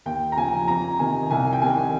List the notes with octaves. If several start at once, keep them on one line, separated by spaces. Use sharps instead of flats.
D#2 G5
A#5
C#3 F3 G#5
F2 A#5
C3 D#3 G#5
C2 G#5
G5
C3 D#3 G#5